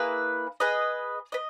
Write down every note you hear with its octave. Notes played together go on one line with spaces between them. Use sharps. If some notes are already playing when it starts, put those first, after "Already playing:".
Already playing: A#3 E4 G#4 B4
G#4 B4 D#5
B4 D#5